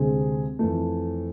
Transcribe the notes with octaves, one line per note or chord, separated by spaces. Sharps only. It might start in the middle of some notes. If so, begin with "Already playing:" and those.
Already playing: D2 C3 G#3 C4 G#4
F2 E3 A3